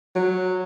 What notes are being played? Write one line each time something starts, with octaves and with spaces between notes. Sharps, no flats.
F#3